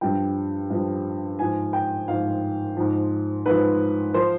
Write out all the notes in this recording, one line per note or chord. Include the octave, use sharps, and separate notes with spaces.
G2 F3 G5
G2 F3
G#2 F3 G#5
G5
G#2 F3 F5
G#2 F3
G#2 F3 B4
F3 C5